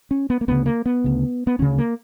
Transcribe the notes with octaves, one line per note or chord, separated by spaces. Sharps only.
C#4
B3
A#3
D2 C#3 B3
A#3
B3
D2 C#3
B3
D2 C#3 C#4
A#3